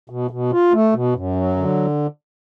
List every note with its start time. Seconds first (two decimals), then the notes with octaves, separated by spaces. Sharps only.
0.10 B2
0.31 B2
0.52 F4
0.73 A3
0.93 B2
1.14 F#2
1.36 F#3
1.57 D3